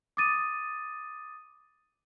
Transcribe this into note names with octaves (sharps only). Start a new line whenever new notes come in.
D6 D#6 A6 D#7